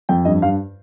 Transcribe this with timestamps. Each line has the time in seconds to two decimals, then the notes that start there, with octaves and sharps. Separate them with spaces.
0.09 F2 G5
0.25 G2 D#5
0.42 G2 F5